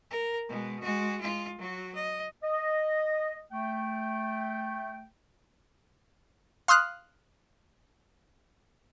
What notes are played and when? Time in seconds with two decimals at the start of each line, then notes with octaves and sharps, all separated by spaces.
0.11 A#4
0.48 B2 G#3
0.83 G#3 F#4
1.21 G#3 F4
1.58 F#3 F#4
1.95 D#5
2.44 D#5
3.52 A3 G5
6.68 F5 C6 D#6 F6 F#6